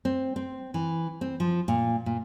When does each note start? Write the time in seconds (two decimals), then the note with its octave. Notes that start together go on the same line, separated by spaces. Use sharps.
0.05 C4
0.36 C4
0.74 E3
1.21 C4
1.40 F3
1.68 A#2
2.06 A#2